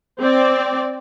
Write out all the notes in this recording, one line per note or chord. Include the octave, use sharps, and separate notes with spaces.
C4 D5